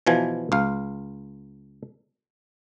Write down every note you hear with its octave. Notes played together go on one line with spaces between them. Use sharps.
B2 E3 F3 G#5
C#2 F5